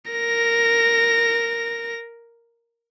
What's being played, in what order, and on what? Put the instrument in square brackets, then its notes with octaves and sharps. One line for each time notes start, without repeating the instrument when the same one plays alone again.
[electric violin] A#4 A#6